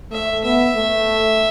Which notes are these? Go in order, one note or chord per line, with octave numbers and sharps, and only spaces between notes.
A3 E5
B3 E5
A3